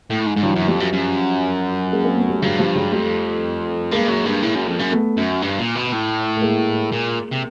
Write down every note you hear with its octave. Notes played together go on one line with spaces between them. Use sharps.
A2
G#2
G#2
G2 E3 F#3
F#2
F#3
F2 F3 G3
F#2
F#2
G#3 A#3
A#3 C4
A3 B3
G3 A3
G2 F#3 G#3
F3 G3
F#3 G#3
F2 G3 A3
G2 G#3 A#3
F#2
G2
A2
F#2
F2
F#2
A3 B3
F#2
G2
A#2
B2
A2
A3
G#3 A#3
A#2
C3